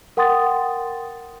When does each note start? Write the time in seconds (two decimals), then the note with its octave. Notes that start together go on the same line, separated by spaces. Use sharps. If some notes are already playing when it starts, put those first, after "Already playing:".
0.17 A#4 F#5 G5 C6 D#6 A6